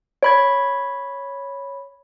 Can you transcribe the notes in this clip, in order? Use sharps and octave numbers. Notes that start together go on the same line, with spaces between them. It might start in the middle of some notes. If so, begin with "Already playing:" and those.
C#5 B5 G#6